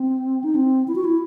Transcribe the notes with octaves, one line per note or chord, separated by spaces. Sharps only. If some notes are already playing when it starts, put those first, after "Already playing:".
Already playing: C4
D#4
C4
E4
F#4
E4